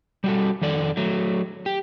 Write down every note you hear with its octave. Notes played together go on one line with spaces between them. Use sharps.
G3 F#4 A4
F2 D#3 A4 D5
F#3 A3
G4